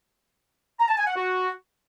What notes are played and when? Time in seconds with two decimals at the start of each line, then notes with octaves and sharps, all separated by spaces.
0.80 A#5
0.89 A5
0.98 G#5
1.07 F#5
1.16 F#4